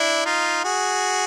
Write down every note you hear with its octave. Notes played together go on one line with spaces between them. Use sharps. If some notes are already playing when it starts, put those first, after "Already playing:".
Already playing: D4 E4
D#4 F4
F#4 G#4